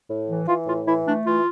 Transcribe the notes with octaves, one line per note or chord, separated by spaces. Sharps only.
A2
E3
E3 F4
A2 F4
E3 E4
A3 D4
E3 F4